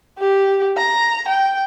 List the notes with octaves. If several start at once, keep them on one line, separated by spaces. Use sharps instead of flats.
G4
A#5
G5